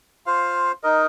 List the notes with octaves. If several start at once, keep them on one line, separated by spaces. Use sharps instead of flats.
F4 C5 F5
D#4 A#4 D#5